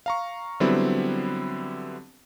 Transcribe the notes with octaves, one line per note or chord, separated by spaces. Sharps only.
F5 A#5 C#6
D3 F#3 G3 B3 C4 E4